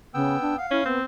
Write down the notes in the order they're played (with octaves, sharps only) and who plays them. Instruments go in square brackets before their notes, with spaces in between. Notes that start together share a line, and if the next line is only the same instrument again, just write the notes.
[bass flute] C#3 [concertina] B3 G5 E6
[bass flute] D4
[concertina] F5 [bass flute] F#5
[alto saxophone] C#4 [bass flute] E4
[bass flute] B3 [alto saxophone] C4